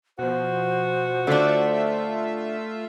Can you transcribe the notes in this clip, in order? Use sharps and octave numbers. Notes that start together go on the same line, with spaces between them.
B2 F3 F#4 C5
D3 A3 D4 F4 E5